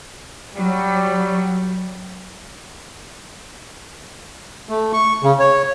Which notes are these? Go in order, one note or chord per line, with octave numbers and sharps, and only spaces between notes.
F#3 G3
A3
C#6
C#3
C#5